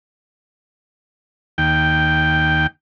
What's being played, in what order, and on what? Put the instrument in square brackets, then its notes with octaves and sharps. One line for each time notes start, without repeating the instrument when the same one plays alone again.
[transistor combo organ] D#2 G5